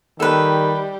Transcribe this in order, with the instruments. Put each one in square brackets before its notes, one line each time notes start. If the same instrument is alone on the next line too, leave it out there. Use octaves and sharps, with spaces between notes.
[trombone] D#3 [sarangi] G3 [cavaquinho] A4 B4